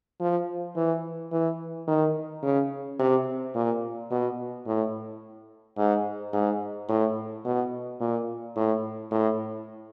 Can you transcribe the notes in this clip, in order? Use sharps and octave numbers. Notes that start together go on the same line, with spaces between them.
F3
E3
E3
D#3
C#3
C3
A#2
B2
A2
G#2
G#2
A2
B2
A#2
A2
A2